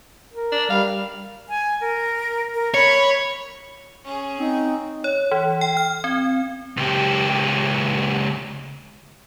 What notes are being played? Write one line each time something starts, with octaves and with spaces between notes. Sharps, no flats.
A#4
D4
G3 F5
G#5
A#4
A#4
C#5 B5
C#4 G#4
C4 D#4
C#5
E3
G5
F6
C4
C#2 G4